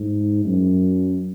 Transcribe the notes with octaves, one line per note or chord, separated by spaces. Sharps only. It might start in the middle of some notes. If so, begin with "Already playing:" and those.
Already playing: G#2
F#2